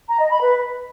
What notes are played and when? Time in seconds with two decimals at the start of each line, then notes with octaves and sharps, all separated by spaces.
0.08 A#5
0.19 D#5
0.30 B5
0.41 B4